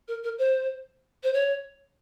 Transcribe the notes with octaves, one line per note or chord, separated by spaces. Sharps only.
A#4
A#4
C5
C5
C#5